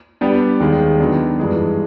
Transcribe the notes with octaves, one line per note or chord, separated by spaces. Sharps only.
G3 B3 D4 G4
D#2 D#3 G#3
D#3 F#3 B3 D4
G2 E3 G#3